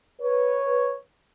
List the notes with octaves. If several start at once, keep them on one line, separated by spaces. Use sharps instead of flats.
B4 C#5